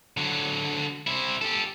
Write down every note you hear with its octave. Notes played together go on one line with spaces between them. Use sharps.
D3 F#3
C3 E4
G4 A4